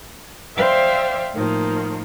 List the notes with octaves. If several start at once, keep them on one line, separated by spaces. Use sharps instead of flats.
C5 D5 E5 F5 G5
A2 D#3 F3 A#3